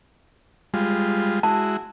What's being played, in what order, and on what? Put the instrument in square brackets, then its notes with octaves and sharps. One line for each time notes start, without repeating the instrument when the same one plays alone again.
[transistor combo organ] G3 G#3 F4
[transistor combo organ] G#3 E4 F#4 [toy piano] A5